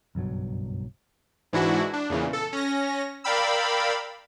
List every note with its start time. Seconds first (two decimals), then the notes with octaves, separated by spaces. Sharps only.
0.15 F#1 B1 G2 F#3
1.53 G#2 E3 D4 E4 F#4
1.93 D4
2.09 E2 A#2 C#3 E3
2.33 A4
2.53 C#4 A#6
3.24 A#4 D5 F5 G5 B5 E6